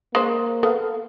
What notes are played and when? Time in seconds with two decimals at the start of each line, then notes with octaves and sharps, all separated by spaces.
0.15 G#3 A#3 C5
0.63 B3 A4 F5